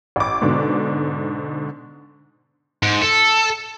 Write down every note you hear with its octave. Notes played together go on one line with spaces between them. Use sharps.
A1 D6
G#2 B2 D3
G#2
A4